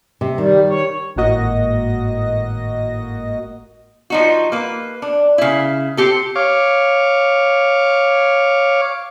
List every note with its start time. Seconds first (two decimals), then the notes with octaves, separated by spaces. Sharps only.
0.21 C3
0.38 D#3 G3
0.69 C#5
1.16 G#1 A2 A#3 F#4 D#5 A#6
4.10 F3 D#4 F#4
4.52 A#3 B4
5.02 D4
5.38 C#3 E4
5.97 C4 G4 A4
6.36 C#5 F5 D6